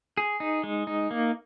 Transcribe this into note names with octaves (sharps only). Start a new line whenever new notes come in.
G#4
D#4
G#3
D#4
A#3